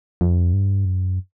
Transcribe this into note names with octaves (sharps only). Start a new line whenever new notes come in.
F2
G2
F#2